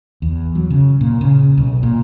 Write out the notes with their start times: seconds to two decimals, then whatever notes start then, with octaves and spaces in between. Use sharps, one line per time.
0.22 E2
0.55 F#3
0.70 C#3
1.01 A#2
1.21 C#3
1.57 B1
1.83 A#2